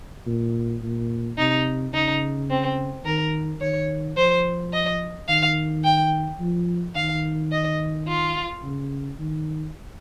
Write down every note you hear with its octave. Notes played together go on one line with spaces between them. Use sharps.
A#2
A#2
C3 D#4
C#3 D#4
C4
D#3 A#4
D#3 C#5
F3 C5
D#5
D#3 F5
G5
F3
D#3 F5
D#5
F4
C#3
D#3